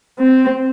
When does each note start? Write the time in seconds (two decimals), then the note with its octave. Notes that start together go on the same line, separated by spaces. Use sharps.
0.19 C4